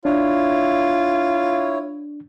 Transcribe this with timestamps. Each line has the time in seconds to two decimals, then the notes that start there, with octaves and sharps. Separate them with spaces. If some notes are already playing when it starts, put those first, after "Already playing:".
0.05 D4 E4 F4 C#5